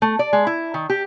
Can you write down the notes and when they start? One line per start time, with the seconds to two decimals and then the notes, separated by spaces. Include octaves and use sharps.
0.02 A3
0.19 D5
0.33 G#3
0.47 E4
0.74 D#3
0.90 G4